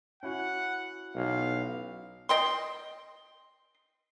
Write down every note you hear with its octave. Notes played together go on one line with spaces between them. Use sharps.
C#4 E4 F#4 F#5
B1 F5
D#5 G5 C6